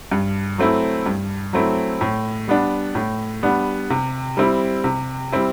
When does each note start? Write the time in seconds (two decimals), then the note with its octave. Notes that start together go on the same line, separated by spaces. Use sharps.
0.12 G2
0.58 F#3 A3 C4 E4
1.06 G2
1.53 F#3 A3 C4 E4
2.01 A2
2.48 G3 B3 D4
2.95 A2
3.43 G3 B3 D4
3.90 C3
4.37 G3 C4 E4
4.84 C3
5.32 G3 C4 E4